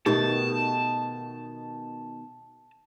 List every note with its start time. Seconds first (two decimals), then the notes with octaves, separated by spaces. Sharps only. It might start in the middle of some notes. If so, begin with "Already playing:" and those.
0.06 B2 D#3 A3 D#4 G4 A5